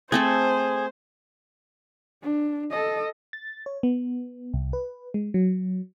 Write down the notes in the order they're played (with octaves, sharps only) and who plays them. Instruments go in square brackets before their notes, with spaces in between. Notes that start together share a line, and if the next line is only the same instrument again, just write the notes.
[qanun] A3 C4 A4 [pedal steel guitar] G#4 [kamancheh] C5
[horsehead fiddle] D4
A4 D#5
[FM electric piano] A6
C#5
B3
C2
B4
G#3
F#3